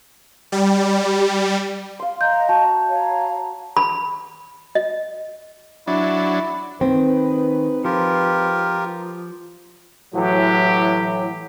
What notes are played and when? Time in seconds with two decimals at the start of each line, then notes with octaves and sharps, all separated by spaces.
0.52 G3
1.99 F5 C6
2.21 D#5 A#5 G6
2.49 F#4 A5
2.88 C#5 F5 A#5
3.77 B5
4.75 D#5
5.87 F#3 D4 E4
6.81 D#3 G#3 C4 D#4 B4
7.84 F3 F4 G4 A#4
10.15 A2 E3 F#3 G4